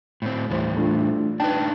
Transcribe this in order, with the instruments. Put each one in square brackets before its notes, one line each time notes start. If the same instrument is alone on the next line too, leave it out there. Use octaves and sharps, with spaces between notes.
[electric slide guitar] A2 C4
[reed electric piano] D#2 C5 [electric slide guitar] A2 E3 G3
[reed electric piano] A3 D4 F4
[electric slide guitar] D4 D#4 B4 [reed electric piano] G5 A5